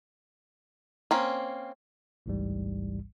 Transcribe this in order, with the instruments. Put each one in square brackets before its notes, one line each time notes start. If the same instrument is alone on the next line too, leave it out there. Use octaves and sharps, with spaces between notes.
[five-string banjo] A#3 C4 C#4
[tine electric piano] A1 D2 G#2 E3 G3